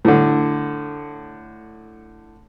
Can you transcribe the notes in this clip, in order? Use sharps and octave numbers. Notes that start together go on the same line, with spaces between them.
A2 D3